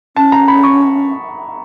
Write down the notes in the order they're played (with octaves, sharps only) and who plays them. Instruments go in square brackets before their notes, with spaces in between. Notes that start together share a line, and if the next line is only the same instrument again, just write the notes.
[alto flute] C#4 [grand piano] A5
[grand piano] A#5
B5
C#6